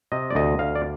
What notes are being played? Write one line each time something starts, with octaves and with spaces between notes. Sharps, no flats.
C3 D#5
D5
D2 D#5
D2 F5
D5